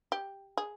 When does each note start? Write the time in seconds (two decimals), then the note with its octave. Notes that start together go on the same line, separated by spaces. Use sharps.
0.12 G4
0.57 G#4